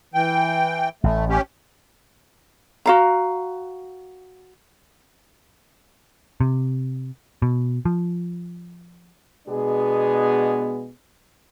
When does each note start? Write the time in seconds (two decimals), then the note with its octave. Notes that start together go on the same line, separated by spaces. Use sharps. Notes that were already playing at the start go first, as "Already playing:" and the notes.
0.14 E3 G5
1.04 A1 A3
1.29 C#4 G4
2.86 F#4 F5 A#5
6.41 C3
7.42 B2
7.85 F3
9.48 B2 G#3 B3 D4 G#4